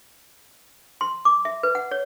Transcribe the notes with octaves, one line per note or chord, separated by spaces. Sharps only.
C6
D6
E5
B4
F#5
C#5